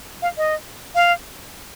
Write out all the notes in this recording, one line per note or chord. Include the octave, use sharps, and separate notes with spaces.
F5
D#5
F5